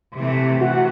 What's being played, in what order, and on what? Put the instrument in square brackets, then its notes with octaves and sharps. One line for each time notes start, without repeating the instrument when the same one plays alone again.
[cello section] C3 E3 A3
[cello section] C3 [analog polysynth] F#4 F#5